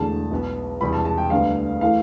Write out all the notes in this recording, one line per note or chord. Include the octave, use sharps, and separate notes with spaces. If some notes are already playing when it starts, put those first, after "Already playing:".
Already playing: E1 E2 D3 A3 A5
B1 B2 B3
E1 E2 C3 G3 B3 B5
A5
A5
G5
D2 D3 G3 B3 F5
E3 A3 F5